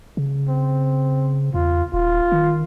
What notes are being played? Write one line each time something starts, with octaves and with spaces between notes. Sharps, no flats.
C#3
C4
E2 F4
D#1 F4
D#3